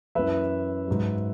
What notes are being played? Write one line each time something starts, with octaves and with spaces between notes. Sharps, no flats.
F#2 E3 B4 E5
G#2 F#3